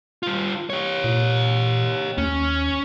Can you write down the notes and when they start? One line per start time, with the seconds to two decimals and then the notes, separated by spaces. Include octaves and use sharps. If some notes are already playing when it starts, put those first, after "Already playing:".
0.23 G3 F4
0.70 G4 C#5
1.04 A#2
2.18 D#2 C#4